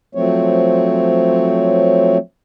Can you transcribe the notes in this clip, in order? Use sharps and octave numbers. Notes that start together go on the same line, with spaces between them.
F3 F#3 A3 C4 C#5